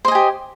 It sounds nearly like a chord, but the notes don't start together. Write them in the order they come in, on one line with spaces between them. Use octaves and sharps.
C5 D#5 G#5 G4